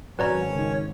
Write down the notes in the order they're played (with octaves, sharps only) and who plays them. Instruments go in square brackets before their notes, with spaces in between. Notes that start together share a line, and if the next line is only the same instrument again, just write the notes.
[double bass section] G#1 [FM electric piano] F#3 [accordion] C#4 C#5 [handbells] B4 D5 A#5
[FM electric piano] C#2 D#3